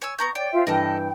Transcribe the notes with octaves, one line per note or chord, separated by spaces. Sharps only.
C#5 G#5 E6
B3 A#5 C#6 G6
C#5 D5 G5
F4 C5 E5
G2 E3 A4 A#4 D#5 G5